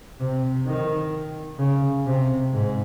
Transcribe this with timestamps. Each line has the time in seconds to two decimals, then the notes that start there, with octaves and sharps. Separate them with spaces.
0.20 C3
0.66 D#3
1.59 C#3
2.06 C3
2.53 G#2